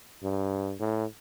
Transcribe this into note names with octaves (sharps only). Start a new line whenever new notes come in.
G2
A2